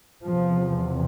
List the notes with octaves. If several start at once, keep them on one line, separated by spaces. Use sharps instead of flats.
E2 C3 F3